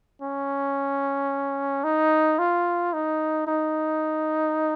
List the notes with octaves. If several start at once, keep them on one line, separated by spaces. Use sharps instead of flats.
C#4
D#4
F4
D#4
D#4